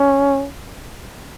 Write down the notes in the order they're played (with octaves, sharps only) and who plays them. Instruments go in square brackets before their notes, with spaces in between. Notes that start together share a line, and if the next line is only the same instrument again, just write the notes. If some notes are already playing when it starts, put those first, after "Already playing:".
Already playing: [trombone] C#4